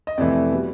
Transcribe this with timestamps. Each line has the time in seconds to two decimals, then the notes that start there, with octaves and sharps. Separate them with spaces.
0.07 D#5
0.17 F2 C3 E3 A3 D5
0.52 B2 G3